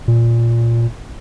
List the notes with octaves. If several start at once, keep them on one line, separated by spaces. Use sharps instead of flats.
A#2